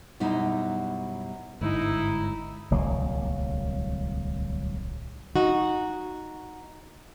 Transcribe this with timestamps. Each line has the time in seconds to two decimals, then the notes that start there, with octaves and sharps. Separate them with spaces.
0.20 F#2 B2 G3 D#4 E4
1.61 G1 G#2 D#4 E4
2.71 D1 C2 F#3 A#3
5.36 D#4 F#4